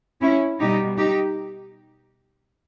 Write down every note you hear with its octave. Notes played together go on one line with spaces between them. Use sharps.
C#4 E4
B2 G3 D#4 G4
D#4 G4